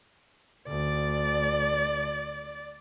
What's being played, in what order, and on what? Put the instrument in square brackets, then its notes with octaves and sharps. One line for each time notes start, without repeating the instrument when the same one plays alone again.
[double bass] D2 [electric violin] D5